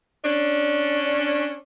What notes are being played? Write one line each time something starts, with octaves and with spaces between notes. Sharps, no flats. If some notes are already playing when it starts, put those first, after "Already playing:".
C#4 D4